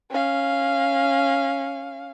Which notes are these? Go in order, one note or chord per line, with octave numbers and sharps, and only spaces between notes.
C#4 F5